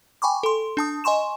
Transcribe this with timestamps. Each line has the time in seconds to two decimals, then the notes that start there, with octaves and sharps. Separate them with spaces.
0.22 G5 G#5 B5 C#6 D6
0.43 A4 C6
0.77 D4 A5 D#6
1.04 D#5 G#5 C6 C#6 E7